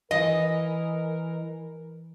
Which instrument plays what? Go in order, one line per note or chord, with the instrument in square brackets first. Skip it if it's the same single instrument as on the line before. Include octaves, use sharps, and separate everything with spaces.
[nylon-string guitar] E3 [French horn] A#4 [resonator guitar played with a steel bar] D#5